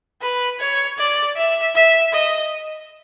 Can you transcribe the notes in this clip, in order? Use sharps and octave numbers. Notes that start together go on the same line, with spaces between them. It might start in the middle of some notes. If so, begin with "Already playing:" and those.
B4
C#5
D5
E5
E5
D#5